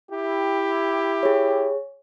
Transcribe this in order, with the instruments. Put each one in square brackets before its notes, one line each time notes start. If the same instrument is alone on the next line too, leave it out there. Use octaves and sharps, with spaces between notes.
[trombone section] E4 G4
[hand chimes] G#4 C#5